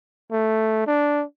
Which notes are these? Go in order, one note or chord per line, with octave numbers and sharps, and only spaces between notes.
A3
D4